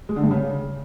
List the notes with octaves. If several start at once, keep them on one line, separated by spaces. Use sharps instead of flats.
G#3
D3
G2
C#3